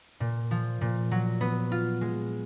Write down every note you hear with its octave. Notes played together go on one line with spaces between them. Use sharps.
A#2
F3
A#2
F#3
B3
F4
G#3